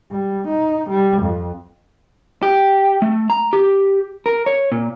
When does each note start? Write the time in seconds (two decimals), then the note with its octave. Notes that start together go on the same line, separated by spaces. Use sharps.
0.11 G3
0.48 D#4
0.90 G3
1.23 F2
2.43 G4
3.02 A3
3.30 A#5
3.53 G4
4.26 A#4
4.46 C#5
4.72 A#2